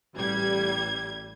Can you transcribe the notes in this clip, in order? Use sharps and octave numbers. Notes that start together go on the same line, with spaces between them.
A1 G3 G#6